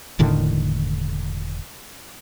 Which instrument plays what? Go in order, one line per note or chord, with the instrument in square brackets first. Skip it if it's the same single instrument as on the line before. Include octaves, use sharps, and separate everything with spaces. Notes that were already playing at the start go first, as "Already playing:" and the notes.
[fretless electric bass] E1 A2 D3 D#3